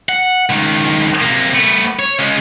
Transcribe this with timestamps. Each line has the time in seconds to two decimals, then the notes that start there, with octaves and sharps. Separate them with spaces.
0.09 F#5
0.50 C#2 D#3
1.22 C3 A#3
1.54 A3 B3
1.99 C#5
2.19 C#3 G#3